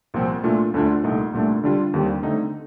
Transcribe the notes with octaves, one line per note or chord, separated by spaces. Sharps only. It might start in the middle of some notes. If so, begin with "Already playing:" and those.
C2 A#2 F3 C4
A#2 A3 D4 F4
D2 D3 A3 D4 F4
C2 A#2 A3 D#4
C2 A#2 A3 D4
D3 G3 D4 F4
D#2 D3 G3 C4
D3 A3 C4 D#4